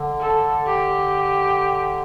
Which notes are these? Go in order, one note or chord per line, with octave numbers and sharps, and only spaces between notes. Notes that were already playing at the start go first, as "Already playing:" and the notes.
Already playing: D3
A4
G4